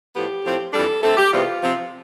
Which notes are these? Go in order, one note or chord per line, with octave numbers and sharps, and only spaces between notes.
A2 F3 B3 G4
A2 F3 C4
F2 E3 G3 D4 A4
D3 A3 C4 A4
G4
E2 C3 G3 B3 F4
C3 F3 C4